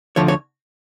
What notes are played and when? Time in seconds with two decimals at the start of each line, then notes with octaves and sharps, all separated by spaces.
0.16 D2 D3 F3 C#5
0.28 C#5